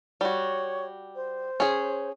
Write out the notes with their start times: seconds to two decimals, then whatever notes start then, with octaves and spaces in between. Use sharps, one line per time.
0.21 G3 F#4 C#5
1.15 C5
1.60 C#4 G#4